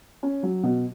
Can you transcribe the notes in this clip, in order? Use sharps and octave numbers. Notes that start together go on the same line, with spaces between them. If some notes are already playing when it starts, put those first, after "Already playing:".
C#4
F#3
B2